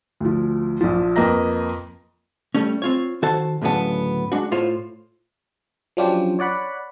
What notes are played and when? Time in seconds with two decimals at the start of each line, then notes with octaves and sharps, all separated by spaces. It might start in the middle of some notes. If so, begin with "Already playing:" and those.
0.20 D2 F3
0.81 A#1 F3
1.16 F2 A#3 B4 D#5 A#5 A#6
2.55 G3 A3 C#4
2.82 C4 F4 C#5
3.22 D#3 F#4 A4 C5 A5
3.62 D2 A2 C#3 F#3 B3 A5
4.32 G#3 D4 F#4
4.51 A2 F4 C5 C#5
5.97 F3 F#3 C#4 D4 F4 G4
6.39 C#5 D5 F#5 B5